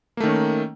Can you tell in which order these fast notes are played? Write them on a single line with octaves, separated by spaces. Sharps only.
A#3 A3 D#3 C#4